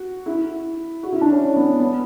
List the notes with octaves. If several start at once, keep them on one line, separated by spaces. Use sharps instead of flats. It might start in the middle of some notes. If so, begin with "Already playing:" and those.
Already playing: F#4
E4
F#4
E4
D4
C#4
C#4
B3
C#4
B3